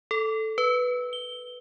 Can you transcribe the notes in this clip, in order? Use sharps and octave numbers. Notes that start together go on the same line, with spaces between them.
A4
B4
G7